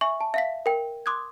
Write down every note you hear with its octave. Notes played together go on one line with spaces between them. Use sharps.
E5 G#5 C#6
A5
E5 F5 B6
A#4 G5
C6 D6 D#6 F#6 G#6